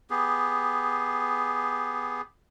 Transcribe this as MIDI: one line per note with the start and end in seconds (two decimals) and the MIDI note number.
0.10 2.21 59
0.10 2.21 67
0.10 2.21 68